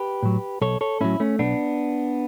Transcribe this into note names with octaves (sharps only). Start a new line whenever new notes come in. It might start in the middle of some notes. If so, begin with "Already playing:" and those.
Already playing: G4 B4
A2 F#3
B1 A4 C#5
A4 C#5
A2 F#3 C#4 E4
A3 C#4
B1 B3 D4